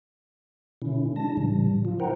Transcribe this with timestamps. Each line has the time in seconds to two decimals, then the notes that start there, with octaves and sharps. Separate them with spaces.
0.82 B2 D3 D#3 C#4 E4
1.16 G#3 D4 A5 A#6
1.37 A2 C#3 E3 G3
1.85 F3 F4
2.00 E4 A#4 C5 F#5 G5 A#5